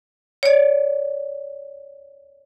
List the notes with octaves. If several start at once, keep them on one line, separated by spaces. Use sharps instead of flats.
C#5 D5